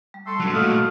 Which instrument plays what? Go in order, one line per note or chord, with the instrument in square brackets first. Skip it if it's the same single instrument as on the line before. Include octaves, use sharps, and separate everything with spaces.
[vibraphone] G3
[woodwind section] A4 C6
[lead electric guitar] G2 F#3
[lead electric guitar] A#2 A3 [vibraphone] F#4 F#5 [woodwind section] A4 D#5 F5